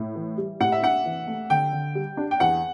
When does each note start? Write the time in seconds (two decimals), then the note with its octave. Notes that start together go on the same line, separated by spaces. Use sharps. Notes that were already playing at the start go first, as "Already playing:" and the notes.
Already playing: A2
0.16 E3
0.38 G3
0.60 A2 F#5
0.72 E5
0.83 D4 F#5
1.06 E3
1.27 A3
1.50 D3 G5
1.73 D3
1.95 G3
2.17 D4
2.31 G5
2.40 E2 F#5